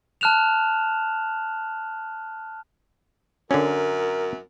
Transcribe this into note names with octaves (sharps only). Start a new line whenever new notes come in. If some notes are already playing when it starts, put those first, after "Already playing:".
A5 F6 F#6 E7 F7
F#2 D3 C#4 A#4